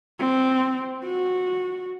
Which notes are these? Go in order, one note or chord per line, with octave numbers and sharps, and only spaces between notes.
C4
F#4